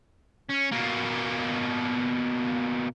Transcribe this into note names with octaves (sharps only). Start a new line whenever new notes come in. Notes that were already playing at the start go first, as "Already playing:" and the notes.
C#4
B2 A#3